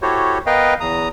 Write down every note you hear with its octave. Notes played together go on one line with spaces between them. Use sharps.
E4 F#4 G4 A4 C5 C#5
B3 A#4 B4 D#5 F5 G5
E2 A#5 D#6